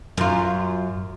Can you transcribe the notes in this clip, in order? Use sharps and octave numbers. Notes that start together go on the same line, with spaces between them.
F#2 F4